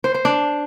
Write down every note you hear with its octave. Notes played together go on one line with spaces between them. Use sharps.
C5
C5
D4